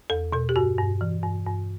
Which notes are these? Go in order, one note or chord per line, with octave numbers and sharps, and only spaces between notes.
E2 A4
B2 A4
G4
G2 F#4
G2
E3
G2
G2